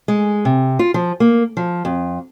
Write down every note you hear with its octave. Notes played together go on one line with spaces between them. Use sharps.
G#3
C3
F4
F3
A#3
F3
F2